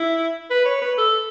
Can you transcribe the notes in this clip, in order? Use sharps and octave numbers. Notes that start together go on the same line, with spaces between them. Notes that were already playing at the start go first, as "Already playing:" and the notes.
Already playing: E4
B4
C#5
B4
A4